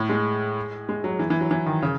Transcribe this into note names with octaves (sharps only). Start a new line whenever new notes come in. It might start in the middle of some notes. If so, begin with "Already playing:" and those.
Already playing: A2
G#3
G#3
F#3
E3
E3
F#3
E3
D#3
C#3